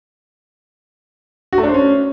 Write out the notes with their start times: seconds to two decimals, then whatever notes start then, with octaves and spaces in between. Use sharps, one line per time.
1.53 F#4
1.58 A3
1.63 D4
1.69 C5
1.74 C#4